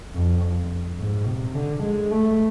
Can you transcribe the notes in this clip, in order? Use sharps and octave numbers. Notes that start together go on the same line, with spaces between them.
F2
G#2
C3
D3
G#3
A3